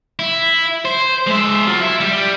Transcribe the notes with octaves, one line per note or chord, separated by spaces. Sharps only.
E4
C5
G#3 E5
F#3 F4
E4
G3 G4